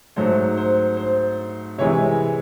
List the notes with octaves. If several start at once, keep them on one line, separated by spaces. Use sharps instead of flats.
G#2 F#3 A3 C5
C5
C5
C3 E3 G#3 C#5